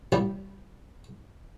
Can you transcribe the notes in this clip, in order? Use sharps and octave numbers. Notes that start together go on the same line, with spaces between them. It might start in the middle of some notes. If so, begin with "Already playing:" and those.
A1 G3